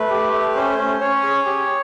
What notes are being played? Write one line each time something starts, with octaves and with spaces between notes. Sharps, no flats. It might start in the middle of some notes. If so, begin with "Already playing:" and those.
Already playing: A3 B4
G4
A3
C#4 C5
C#4
C#4 C#5
G#4
G4